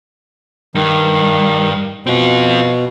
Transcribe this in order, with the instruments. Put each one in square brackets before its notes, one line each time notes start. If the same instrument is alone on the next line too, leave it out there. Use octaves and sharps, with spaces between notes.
[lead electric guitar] G2 [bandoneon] D#3
[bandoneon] B2 [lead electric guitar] C4 F4